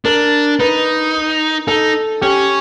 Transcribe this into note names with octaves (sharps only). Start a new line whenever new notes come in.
D4 A#4
D#4 B4
D#4 A4
C#4 G4